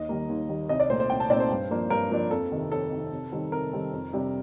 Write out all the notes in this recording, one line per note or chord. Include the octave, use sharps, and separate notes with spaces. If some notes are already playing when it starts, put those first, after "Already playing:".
Already playing: D#2 D#5
D#3 G3 A#3
D#2
D#3 G3 A#3
C2 D#5
D5
A#2 A3 C4 D#4 C5
C5
C2 G5
A5
A#2 A3 C4 D#4 D5
C5
G2
F3 A#3 D4
G2 A#4
F3 A#3 D4
F2 A4
C3 D#3
F2 A4
C3 D#3
C3
D#3 G3 C4 D#4
C3 A#4
D#3 G3 C4 D#4
F2
C3 G3 D4